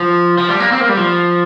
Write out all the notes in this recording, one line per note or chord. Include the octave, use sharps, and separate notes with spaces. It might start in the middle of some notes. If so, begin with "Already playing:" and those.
Already playing: F3
F3
G3
A#3
C4
A#3
G3
F3